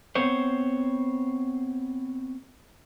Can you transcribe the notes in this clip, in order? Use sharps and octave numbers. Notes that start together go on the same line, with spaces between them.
B3 C4 C5 C#5